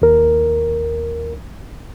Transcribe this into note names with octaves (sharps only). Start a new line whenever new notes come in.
D#2 A#4